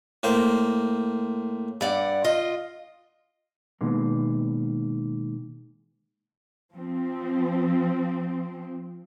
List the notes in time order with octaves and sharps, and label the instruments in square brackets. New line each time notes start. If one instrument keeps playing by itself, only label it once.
[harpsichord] A2 A#3 C5
[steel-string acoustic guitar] G2 D5 F#5
F4 D#5
[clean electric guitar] B2 D#3 G#3 A#3
[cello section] F3 C4